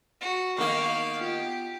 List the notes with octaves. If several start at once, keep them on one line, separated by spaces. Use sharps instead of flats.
F#4
D#3 A#3 B3 F5 C#6
F4 G4